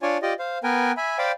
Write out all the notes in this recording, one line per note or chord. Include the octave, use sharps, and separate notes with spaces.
D4 F4 C#5 D5 G#5
F4 G4 D5 D#5
C5 F5
B3 A#4 B4 G5 G#5
E5 G#5 B5
C5 D5 F5 G5 B5